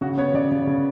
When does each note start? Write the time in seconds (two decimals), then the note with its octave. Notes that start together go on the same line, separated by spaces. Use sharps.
0.01 C#3 F#4
0.18 B3 C#5
0.34 C#3 D5
0.52 C#3
0.67 C#3